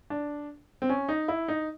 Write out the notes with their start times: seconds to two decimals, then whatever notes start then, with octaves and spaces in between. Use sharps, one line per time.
0.10 D4
0.82 C4
0.89 C#4
1.09 D#4
1.28 E4
1.48 D#4